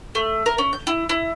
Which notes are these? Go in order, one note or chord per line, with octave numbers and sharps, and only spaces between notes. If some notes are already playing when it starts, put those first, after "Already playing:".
A3
A#4
C#4
G6
E4
E4